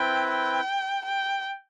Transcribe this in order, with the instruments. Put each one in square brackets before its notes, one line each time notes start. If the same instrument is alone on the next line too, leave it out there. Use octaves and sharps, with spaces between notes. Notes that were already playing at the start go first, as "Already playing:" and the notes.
Already playing: [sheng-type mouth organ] C4 E4 B4 [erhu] G5
[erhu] G5
G5